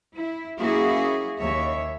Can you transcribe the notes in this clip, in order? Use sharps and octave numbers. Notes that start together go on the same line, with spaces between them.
E4
F#3 A#3 C#4 E4 F#4 G#4
D#2 C#5 E5